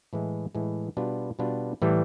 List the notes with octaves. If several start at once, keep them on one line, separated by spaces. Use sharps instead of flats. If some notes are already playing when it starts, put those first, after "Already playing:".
A2 E3 G#3
A2 E3 G#3
B2 G3 B3 D4 F4
B2 G3 B3 D4 F4
A2 E3 G3